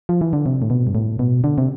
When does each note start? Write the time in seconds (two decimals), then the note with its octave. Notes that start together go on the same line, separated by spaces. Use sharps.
0.09 F3
0.21 E3
0.33 D3
0.46 C3
0.62 A2
0.70 B2
0.87 G2
0.95 A2
1.19 B2
1.44 D3
1.58 C3